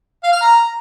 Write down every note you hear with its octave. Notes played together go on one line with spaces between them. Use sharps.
F5
F6
A#5